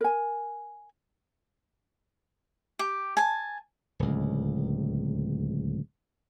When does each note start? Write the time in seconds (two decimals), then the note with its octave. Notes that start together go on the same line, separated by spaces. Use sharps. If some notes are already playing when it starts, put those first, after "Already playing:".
0.01 A#4 G#5
2.79 G4
3.17 G#5 A5
3.99 D1 C#2